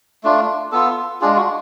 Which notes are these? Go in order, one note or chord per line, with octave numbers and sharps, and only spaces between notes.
A3 D4 F4
B3 F4 A4
G#3 D4 F4 G#4
F#4